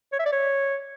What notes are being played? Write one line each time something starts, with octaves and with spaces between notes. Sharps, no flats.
C#5
E5
D5
C#5